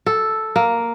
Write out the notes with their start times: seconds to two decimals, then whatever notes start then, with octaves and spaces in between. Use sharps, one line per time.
0.06 A4
0.56 A#3